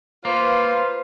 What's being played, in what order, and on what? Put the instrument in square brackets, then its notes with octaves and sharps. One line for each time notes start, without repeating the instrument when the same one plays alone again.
[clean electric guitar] A#3 [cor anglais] F4 [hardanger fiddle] B4 [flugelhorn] C5